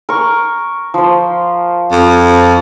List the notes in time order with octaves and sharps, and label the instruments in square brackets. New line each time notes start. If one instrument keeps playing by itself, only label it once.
[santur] A#4 C#6
F3 C5
[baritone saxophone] F2